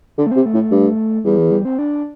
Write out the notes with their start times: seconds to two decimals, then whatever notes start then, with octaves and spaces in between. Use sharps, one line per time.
0.18 D3 D4
0.27 A3
0.31 C3 C4
0.46 A3
0.54 A2
0.58 A3
0.71 G2
1.24 E2 G3
1.38 E3
1.51 G3
1.65 C4
1.79 D4